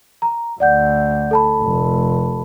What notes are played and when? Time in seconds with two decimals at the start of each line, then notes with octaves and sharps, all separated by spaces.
0.22 A#5
0.60 D2 D5 F#5 G6
1.31 A4 A5 B5
1.62 F1